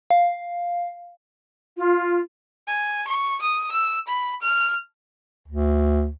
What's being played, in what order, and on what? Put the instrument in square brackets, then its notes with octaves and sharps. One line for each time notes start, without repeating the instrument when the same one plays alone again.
[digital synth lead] F5
[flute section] F4
[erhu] G#5
C#6
D#6
E6
B5
F6
[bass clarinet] D2